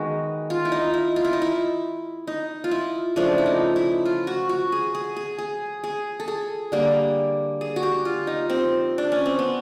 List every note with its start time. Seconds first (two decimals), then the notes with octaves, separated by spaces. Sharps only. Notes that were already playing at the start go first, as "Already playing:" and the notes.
Already playing: D#3 G#3 B3 F#4
0.50 F4
0.65 E4
0.72 D#4
0.94 E4
1.16 F4
1.25 E4
1.33 D#4
1.42 E4
2.27 D#4
2.64 F4
2.71 E4
3.16 C#3 F3 A3 D4
3.38 E4
3.46 D#4
3.76 E4
4.05 F4
4.27 F#4
4.49 F#4
4.72 G#4
4.95 G#4
5.16 G#4
5.38 G#4
5.84 G#4
6.20 A4
6.28 G#4
6.72 D3 G3 A#3
7.61 G#4
7.76 F#4
7.83 G4
8.05 F4
8.27 D#4
8.50 C4
8.98 D4
9.12 C#4
9.26 C4
9.39 B3